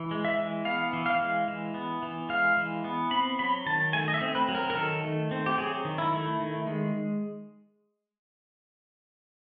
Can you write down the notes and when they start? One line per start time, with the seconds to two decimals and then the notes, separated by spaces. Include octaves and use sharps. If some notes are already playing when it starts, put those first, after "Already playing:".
Already playing: E3
0.11 G#3
0.25 E5
0.38 E3
0.65 B3 F5
0.93 E3
1.06 F5
1.20 G#3
1.48 E3
1.74 B3
2.03 E3
2.29 G#3 F5
2.57 E3
2.84 B3
3.11 C4 B5
3.39 F#3 B5
3.66 D#3 A5
3.93 A3 G#5
4.08 D#5
4.14 E5
4.21 C4
4.35 B4
4.48 F#3
4.55 A#4
4.70 A#4
4.75 D#3 A4
5.04 A3
5.31 C4
5.46 G4
5.58 F#3 G#4
5.85 D#3
5.98 E4
6.12 A3
6.40 D#3
6.67 G#3